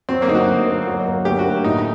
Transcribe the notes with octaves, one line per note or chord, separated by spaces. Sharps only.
F#3 C4
A#3
D2 D#4
F#4
F#3
A#3
F#3
A#3
D2 G4
F#4
A#3
A2 D#4